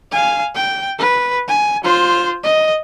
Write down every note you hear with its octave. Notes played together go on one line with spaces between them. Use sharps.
F5 G#5
G5
B4
G#5
F4 C5
D#5